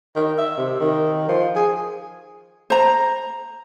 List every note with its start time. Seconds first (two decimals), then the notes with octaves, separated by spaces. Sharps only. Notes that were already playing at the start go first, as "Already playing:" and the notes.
0.15 D#3
0.38 E5
0.57 C3
0.80 D#3
1.28 F3
1.55 G#4
2.70 C5 A#5